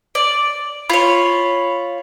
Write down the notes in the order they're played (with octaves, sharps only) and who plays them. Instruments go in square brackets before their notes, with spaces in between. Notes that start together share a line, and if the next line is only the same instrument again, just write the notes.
[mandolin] D5
[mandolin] F4 C#5 [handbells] B5